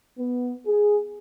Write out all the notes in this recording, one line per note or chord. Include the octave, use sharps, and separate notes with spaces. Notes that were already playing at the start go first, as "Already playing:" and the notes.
B3
G#4